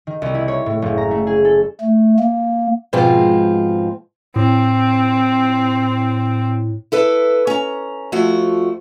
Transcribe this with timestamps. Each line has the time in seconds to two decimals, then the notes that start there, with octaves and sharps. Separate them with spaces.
0.07 D#3
0.22 C2
0.34 E4
0.48 C#5
0.66 A2
0.82 F#1
0.98 A#5
1.11 A3
1.27 G#4
1.45 A4
1.81 A3
2.19 A#3
2.93 G#2 B2 F3 G#3 C4 F4
4.36 A2 C4
6.92 E4 A4 B4
7.47 C#4 A#5
8.12 F2 F3 A3 F#4